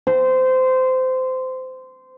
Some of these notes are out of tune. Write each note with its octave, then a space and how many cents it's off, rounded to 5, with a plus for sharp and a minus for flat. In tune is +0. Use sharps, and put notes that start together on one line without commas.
C5 -20